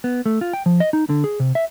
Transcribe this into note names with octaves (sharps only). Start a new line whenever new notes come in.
B3
A3
F4
G5
F3
D#5
D#4
D3
G#4
C3
E5